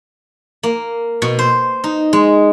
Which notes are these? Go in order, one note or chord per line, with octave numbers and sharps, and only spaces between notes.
A#3
B2
C5
D#4
G#3